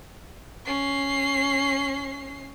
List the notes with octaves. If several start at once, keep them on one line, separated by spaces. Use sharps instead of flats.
C#4 C7